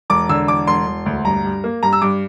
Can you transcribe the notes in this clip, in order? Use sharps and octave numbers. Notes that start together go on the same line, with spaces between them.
E1 D6
D3 E6
E1 D6
E1 C6
E1
D2
G2 A#5
G2
A#3
G2 A#5
E6
G2 D6